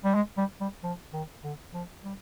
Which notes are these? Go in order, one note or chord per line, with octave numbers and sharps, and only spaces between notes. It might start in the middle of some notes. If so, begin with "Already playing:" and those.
G3
G#3
G3
G3
F3
D#3
D3
F3
G3